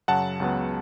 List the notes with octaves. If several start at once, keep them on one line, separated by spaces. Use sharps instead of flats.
F#2 C#3 F#3 F#5 A5
C#2 C#3 F#3 B3